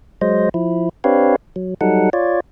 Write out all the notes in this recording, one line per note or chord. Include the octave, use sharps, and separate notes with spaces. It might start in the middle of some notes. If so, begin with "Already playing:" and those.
F#3 G#3 C5 D#5
F3 E4
C4 D4 G4 B4 C#5 F5
F#3
F#3 G3 D#4 A4 F#5
F4 C#5 D5